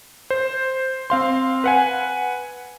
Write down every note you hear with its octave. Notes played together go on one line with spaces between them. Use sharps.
C5
C4 F5 C6
B4 F#5 G#5